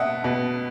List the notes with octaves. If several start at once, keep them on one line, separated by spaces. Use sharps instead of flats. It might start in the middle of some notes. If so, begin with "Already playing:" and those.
Already playing: B2 D#5 E5 F#5
B2